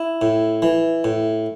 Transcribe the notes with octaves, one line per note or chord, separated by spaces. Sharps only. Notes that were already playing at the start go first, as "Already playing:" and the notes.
Already playing: E4
A2
E3
A2